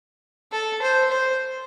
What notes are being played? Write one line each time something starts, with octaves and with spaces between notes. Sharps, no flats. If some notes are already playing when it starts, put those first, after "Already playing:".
A4
C5
C5